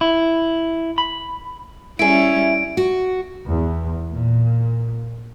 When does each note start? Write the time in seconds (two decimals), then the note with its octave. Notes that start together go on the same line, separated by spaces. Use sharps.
0.01 E4
0.98 B5
1.99 G3 C#4 E4 G#4 D7
2.77 F#4
3.47 E2
4.13 A#2